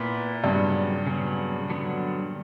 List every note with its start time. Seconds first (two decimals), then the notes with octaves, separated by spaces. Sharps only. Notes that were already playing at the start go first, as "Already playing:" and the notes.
Already playing: A#2 B3 E4 B4
0.43 G2 C#3 F#3 B3
1.07 C#3 F#3 B3
1.70 D3 F#3 B3 D4